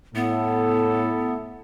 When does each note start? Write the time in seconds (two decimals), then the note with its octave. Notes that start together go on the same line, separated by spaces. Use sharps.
0.15 A2 B3 E4 A4